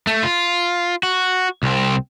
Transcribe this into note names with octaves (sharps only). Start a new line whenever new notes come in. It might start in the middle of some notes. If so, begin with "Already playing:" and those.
A3
F4
F#4
C2 C4